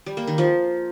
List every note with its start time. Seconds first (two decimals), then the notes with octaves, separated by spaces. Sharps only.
0.06 G3
0.17 A#3
0.27 D#3
0.38 F3